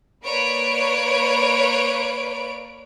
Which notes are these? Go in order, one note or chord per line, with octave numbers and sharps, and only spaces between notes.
A#3 B4 C#5 D5 D7